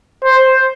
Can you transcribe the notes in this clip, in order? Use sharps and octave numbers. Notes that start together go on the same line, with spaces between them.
C5